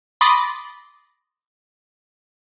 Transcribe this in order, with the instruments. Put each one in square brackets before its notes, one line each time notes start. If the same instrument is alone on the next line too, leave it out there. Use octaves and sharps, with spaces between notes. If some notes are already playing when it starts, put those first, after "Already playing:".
[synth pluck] B5 C6 D6 D#6 A6 A#6